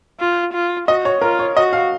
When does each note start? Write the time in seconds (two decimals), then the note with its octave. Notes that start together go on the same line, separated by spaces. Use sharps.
0.19 F4
0.53 F4
0.88 F#4 D#5
1.05 C#5
1.21 F4 A#4
1.39 C#5
1.56 F#4 D#5
1.73 F5